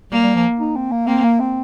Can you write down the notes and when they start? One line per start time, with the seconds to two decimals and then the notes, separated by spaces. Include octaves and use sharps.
0.11 G3 A#3
0.23 G3
0.35 F3
0.60 D#4
0.76 C4
0.92 A#3
1.07 A#3 C4
1.24 A#3
1.40 C4